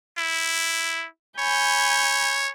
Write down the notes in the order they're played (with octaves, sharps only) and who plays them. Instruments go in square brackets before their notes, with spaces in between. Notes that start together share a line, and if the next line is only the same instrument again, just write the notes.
[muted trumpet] E4
[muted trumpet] C#5 [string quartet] G#5 B5 G6